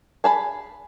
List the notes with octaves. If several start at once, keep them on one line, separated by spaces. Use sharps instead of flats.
G#4 A5 B5